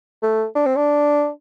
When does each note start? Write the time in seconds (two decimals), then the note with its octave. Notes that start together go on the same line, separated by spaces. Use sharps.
0.23 A3
0.55 D4
0.66 C4
0.76 D4